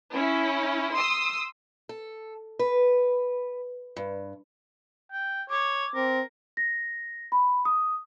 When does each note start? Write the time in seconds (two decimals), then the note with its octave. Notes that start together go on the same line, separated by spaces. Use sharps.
0.14 C#4 E4
0.93 C6 D#6 E6
1.89 A4
2.59 B4
3.97 G2
5.12 G5
5.50 C#5 D6
5.95 C4 A#4
6.57 A#6
7.32 B5
7.65 D#6